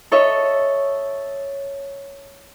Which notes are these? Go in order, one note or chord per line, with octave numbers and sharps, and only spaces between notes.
A4 C#5 D#5 E5